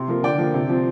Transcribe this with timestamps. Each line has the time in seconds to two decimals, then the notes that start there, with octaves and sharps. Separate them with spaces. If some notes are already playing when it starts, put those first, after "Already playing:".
Already playing: C3 C6
0.08 F3 A#3
0.23 D3 D5 G5
0.38 F3 A#3
0.54 C3
0.69 F3 C4